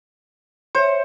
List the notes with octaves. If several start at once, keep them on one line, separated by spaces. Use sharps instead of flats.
C5 C#5 E5